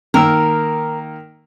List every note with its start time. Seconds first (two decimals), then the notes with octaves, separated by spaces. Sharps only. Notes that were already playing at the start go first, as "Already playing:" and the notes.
0.14 D#3 A#3 A#4 E6